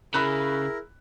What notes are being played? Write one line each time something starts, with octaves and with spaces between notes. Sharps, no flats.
C#3 E4 G#4 A#4 B5 F#6